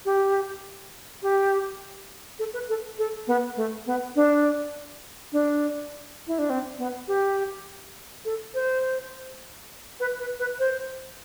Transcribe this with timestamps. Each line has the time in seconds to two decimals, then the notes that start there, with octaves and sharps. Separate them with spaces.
0.05 G4
1.23 G4
2.39 A4
2.54 B4
2.69 A4
2.99 A4
3.28 B3
3.57 A3
3.86 B3
4.16 D4
5.32 D4
6.27 E4
6.38 D4
6.50 C4
6.79 B3
7.08 G4
8.25 A4
8.54 C5
10.00 B4
10.19 B4
10.40 B4
10.59 C5